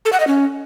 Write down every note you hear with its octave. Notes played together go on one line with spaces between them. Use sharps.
A4
F#5
D#5
C#4